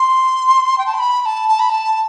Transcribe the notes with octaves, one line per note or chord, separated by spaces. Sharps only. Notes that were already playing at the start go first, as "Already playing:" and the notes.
Already playing: C6
G5
A5
C6
B5
B5
A5
A5
B5
A5